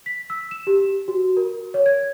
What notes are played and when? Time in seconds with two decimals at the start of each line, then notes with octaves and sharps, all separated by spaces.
0.06 B6
0.30 E6
0.51 E7
0.67 G4
1.08 F#4
1.37 A#4
1.74 C#5
1.86 G#6